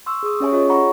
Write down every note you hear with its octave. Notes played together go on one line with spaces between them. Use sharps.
C6 C#6 E6
G#4 D#6
C#4 G4 C#5 E5 G#5 C#6
F4 G#4 C#5 D#5
F#5 A#5 B5 C#6